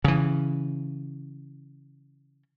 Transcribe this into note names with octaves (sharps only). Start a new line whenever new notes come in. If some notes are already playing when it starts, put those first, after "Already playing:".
C#3 E3